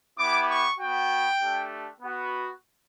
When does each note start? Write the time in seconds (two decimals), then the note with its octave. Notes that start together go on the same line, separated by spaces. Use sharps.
0.18 B3 E4 G4 D6
0.49 C#6
0.79 B3 F#4 G5
1.40 A3 D4 G4
2.01 B3 F#4